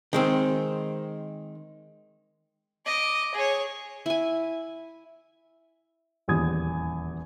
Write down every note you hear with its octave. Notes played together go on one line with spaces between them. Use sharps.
D#3 G#3 C4
D#5 D6
G#4 C#5
E4 G#5
D#1 E2 G4 D#6 G#6